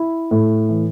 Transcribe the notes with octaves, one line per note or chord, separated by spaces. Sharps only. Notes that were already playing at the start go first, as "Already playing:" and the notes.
Already playing: E4
A2
E3